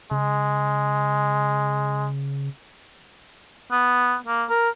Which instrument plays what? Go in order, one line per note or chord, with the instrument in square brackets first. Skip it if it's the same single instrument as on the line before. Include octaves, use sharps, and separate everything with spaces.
[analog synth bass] C#3 [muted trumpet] G#3
[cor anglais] B3
A#3
A#4